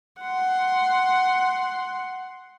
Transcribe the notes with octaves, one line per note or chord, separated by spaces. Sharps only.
F#5 C6